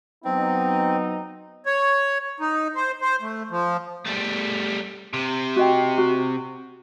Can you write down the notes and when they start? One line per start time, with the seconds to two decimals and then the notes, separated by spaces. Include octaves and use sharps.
0.25 F#3 B3 C4 D#4
1.66 C#5
2.40 D#4
2.75 C5
3.01 C5
3.21 A3
3.50 F3
4.05 G3 A3
5.13 C3
5.56 F#4 D#5 G5
5.98 F#4